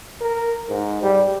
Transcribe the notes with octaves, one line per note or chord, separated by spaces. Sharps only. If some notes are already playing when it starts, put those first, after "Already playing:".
A#4
G#2
G3